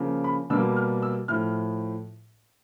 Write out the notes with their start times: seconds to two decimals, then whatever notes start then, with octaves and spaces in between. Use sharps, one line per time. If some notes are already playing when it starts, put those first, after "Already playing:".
Already playing: C#3 F3 A#3
0.24 B5
0.50 B2 G3 A#3 E6
0.76 F6
1.03 E6
1.28 A2 F3 F6